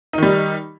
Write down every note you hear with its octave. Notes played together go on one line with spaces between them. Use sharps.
D#3 G3 D#4